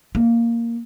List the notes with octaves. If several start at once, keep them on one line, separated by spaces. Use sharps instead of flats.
A#3